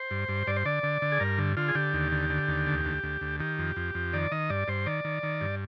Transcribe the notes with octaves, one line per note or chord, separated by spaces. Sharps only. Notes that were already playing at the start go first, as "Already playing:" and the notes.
Already playing: C5
G2
G2
G2 D5
C5
D3 D5
D3
D3
G#4
G2 A#4
D3
D3 F4
G#4
D3 G4
D#2
D3
D3
D#2
D2
D2
D2
D2
D#3 G4
F2
F2
F2
D#3 D5
D#3 D#5
G2 D5
G2 C5
D#3 D5
D#3
D#3
G2